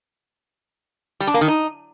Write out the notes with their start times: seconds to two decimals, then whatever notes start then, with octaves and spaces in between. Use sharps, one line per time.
1.20 G3
1.27 D4
1.34 A#3
1.41 D#3
1.48 D#4